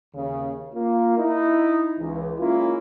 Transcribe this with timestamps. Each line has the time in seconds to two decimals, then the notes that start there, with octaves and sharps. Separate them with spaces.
0.14 D#2 C#3
0.75 A#3 F4
1.18 D#4 E4
1.99 C#2 E3
2.39 G#3 A#3 C#4 E4 F4